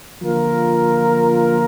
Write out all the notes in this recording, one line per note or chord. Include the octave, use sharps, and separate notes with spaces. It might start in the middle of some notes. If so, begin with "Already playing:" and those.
D3 F3 A#3 F4 A#4